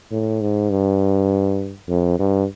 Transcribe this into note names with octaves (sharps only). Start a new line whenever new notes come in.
A2
G#2
G2
F2
G2